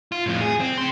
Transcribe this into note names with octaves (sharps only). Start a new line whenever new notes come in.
F4
F2 A2
G#4
C4
C#3 C6